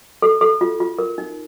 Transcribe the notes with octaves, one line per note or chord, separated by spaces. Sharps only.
A4
A4
F4
F4
A#4
D#4